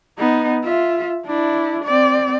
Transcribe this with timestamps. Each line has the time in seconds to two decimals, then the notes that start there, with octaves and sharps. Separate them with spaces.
0.19 B3 D#4
0.64 F4 E5
1.27 D4 E4
1.85 C4 D5